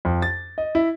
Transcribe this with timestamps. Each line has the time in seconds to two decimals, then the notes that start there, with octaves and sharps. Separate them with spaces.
0.05 F2
0.22 A6
0.58 D#5
0.75 E4